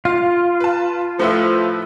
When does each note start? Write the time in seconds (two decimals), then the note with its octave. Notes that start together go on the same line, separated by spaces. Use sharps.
0.05 F4 F5
0.60 B4 A5
1.20 A2 F3 A3 B4 E5